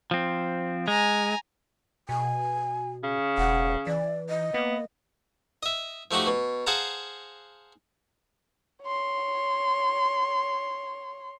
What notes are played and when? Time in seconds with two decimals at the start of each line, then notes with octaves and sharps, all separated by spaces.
0.11 F3 C4
0.88 G#3 G#5 A#5
2.09 B2 G#5
3.03 C#3
3.38 E1 F#5
3.87 E3 D5
4.29 D#5
4.54 A#3 B3
5.63 D#5 E5
6.11 F3 A3 D#4 F#4 G4
6.27 B2
6.67 G#4 C5 F5 F#5 A5 A#5
8.83 C#5 C6